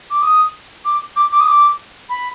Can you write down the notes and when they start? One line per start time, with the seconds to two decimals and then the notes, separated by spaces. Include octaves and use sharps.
0.11 D6
0.22 D#6
0.85 D6
1.16 D6
1.32 D6
1.40 D#6
1.48 D6
2.10 B5